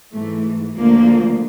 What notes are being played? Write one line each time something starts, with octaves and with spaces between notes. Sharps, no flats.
G#2 E3 A3
D2 D3 F3 A#3